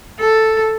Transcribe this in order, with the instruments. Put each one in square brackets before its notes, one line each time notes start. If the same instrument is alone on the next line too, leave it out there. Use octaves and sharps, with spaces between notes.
[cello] A4